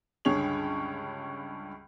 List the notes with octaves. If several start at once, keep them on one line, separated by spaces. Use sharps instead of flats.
C#2 G2 D3 G#4 C#5 F7